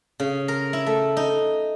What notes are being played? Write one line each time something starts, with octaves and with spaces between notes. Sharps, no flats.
C#3
A#4
E4
A3
D#4